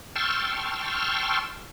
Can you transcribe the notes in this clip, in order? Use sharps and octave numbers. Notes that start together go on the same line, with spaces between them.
G5 A5 C6 C#6 E6 F6